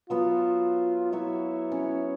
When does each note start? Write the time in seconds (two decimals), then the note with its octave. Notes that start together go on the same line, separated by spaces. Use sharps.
0.10 F#3 B3 F4 F#4
1.12 F#3 E4 C#5 E5
1.72 C#4